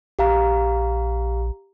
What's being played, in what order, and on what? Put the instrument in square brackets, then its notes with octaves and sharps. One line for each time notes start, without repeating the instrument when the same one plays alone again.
[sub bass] A#1 [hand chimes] G4 F5 A#5